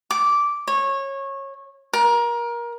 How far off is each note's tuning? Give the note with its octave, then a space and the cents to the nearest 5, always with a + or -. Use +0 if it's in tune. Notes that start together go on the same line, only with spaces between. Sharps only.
D6 -10
C#5 -20
A#4 +25